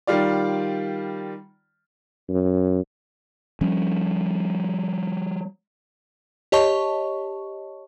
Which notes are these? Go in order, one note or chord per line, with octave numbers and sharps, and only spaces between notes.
D#3 G3 F4 D5
F#2
F3 G3 C#4
G4 C#5 D#5 A5 C#6